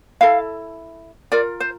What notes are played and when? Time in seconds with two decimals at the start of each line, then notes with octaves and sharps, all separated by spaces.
0.21 E4 A4 F5
1.32 F4 A#4 D5
1.60 C5